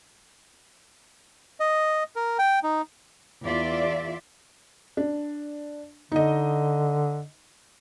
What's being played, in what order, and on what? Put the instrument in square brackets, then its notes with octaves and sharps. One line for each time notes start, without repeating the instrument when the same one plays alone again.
[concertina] D#5
A#4
G5
D#4
[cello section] E2 F4 D5 E5
[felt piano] D4
[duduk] D3 [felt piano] D#4 D#5